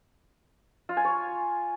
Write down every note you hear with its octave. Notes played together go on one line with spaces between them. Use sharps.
F4
G#5
C#5